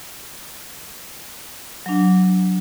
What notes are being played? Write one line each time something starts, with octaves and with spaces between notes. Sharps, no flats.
F#3 D4